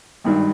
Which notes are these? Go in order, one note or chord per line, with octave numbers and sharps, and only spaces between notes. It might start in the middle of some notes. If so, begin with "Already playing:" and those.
G#1 G2 D#3